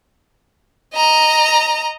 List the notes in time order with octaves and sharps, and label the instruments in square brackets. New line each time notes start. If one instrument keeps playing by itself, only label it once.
[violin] D#5 A#5